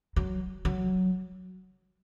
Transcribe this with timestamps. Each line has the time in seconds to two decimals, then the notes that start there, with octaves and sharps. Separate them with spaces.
0.16 F#3
0.65 F#3